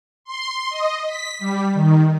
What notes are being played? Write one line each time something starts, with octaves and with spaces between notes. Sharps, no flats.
C6
D#5
B6
G3
D#3